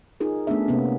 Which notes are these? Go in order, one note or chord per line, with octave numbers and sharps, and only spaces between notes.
D#4 F4 G#4 A#4
A3 B3 C#4 D4 G#4 E5
C3 A#3 B3 C#4